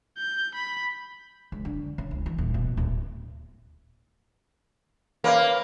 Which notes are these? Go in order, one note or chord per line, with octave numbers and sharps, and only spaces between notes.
G6
B5
C#2
D3
C#3
C#2
E3
D#1
B2
D1
A#3 C#4 B4 F5